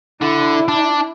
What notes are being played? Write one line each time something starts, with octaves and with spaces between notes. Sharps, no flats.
D3 E4
D4